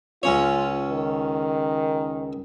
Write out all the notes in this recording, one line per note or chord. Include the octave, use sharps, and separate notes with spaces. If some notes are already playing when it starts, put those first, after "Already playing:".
C#2 C#4 F4 C#5
D#3